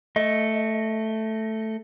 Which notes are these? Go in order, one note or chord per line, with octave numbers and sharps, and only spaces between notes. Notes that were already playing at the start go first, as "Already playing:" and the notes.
A3 D#5